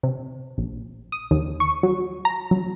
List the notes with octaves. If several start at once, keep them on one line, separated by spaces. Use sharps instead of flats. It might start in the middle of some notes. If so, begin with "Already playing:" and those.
C3
A#1
D#6
D#2
C#6
F#3
A#5
F#3